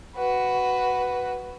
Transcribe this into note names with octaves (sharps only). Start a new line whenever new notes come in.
F#4 B4